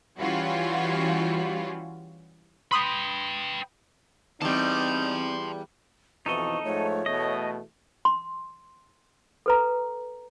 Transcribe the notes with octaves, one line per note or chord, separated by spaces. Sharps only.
E3 G3 C#4 F4 F#4
B4 G5 B5 C6 D#6
E2 G3 C4 D#4 A5 C6
F2 B2 E3 D#4 A4 D#5 C#6
G#2 F3 A3 C#5
E2 B2 A3 D#5
C6
A4 B4 A#5